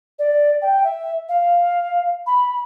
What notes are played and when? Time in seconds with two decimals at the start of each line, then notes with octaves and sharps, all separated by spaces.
0.18 D5
0.61 G5
0.84 E5
1.28 F5
2.26 B5